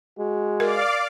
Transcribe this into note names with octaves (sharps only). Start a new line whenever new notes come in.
G#3 F#4
A#4 D5 F5 D6